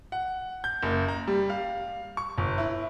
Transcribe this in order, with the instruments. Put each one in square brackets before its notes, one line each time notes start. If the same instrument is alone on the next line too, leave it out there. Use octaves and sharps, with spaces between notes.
[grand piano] F#5
G6
F#1
A#5
G3
F5
C#6
G1
E4